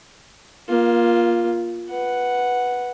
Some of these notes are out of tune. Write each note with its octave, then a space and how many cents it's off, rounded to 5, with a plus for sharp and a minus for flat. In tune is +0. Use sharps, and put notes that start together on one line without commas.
A#3 +25 F4 +0
B4 -5 F#5 +0